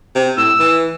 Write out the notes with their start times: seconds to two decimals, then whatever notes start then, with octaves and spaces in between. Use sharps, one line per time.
0.15 C3
0.37 A2 E6
0.59 E3